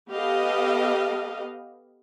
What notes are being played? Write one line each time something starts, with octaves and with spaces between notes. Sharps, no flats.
B3 G4 A4 D#5 F5